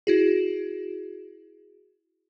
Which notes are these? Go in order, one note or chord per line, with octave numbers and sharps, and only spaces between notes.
E4 F#4 G#4